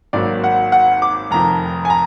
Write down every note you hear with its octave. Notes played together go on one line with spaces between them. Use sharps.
G#1 G#2 F#3 A#3 D5
F#5
F#5
D6
F1 F2 D#3 A#5
G#5
A#5